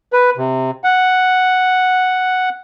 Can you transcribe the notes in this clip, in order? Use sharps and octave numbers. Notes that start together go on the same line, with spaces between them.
B4
C3
F#5